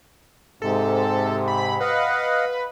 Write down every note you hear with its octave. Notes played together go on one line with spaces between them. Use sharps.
G#2 C3 A4
B5
B4 D#5 F5 F#5